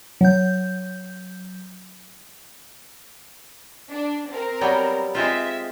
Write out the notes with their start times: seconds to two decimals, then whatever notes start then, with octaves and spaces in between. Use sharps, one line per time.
0.21 F#3 G6
3.91 D4
4.29 C4 A#4
4.61 F#3 G3 B3
5.15 G#3 C4 F4 E5